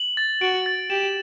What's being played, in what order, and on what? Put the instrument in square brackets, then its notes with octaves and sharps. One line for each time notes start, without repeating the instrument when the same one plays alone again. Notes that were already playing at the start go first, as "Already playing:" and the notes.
Already playing: [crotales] F#7
A6
[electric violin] F#4 [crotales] D7
[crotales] A6
[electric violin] G4 [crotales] E7